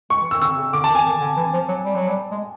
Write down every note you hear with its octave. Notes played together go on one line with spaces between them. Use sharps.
G#3 C#6
E3
D#3 E6
D3 E6
C#3
D3 D6
D#3 A5
G#5
D#3
D3
E3
F3
F#3
G3
F#3
G3
G#3